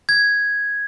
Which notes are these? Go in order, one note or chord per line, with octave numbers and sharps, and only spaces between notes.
G#6